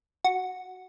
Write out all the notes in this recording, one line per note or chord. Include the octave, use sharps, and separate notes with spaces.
F#4